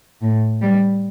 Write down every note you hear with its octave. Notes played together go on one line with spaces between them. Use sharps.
A2
G3